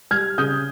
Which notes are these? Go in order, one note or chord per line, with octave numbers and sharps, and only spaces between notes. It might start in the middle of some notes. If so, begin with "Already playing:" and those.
G3 F6 G#6
C#3 D#6 G6